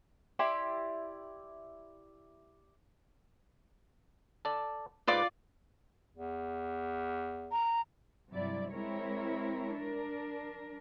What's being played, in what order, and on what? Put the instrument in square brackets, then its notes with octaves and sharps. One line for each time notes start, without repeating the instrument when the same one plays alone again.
[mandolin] E4 G4 D5 C6
[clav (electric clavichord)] A4 D5
[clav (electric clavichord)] G#2 B4 [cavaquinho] F4 D5 D6
[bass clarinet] E2
[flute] A#5
[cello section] G2 C3 F#3 E4 D5
G#3 C4 E4 A#4 C#5
D4 A#4